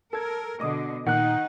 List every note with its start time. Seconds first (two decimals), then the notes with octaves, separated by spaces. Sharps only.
0.13 A4 A#4 G#6
0.60 B2 D3 D#5 D6 D#6
1.07 A#2 D#3 D#4 F#5 F#6